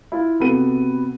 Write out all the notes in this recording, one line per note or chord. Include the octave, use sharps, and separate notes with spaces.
E4 F4
C3 B3 F#4 A4 D#7